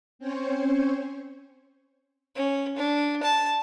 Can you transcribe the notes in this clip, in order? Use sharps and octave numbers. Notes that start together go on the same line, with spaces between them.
C4 C#4 C5 C#5
C#4
D4
A5